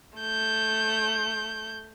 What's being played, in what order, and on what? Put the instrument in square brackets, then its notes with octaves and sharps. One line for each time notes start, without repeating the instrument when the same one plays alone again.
[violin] A3 G6